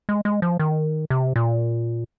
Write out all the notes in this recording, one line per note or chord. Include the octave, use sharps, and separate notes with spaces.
G#3
G#3
F3
D#3
C3
A#2